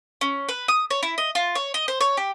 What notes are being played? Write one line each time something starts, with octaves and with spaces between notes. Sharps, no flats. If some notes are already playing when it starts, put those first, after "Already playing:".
C#4
B4
D#6
C#5
E4
D#5
F4
C#5
D#5
C5
C#5
G4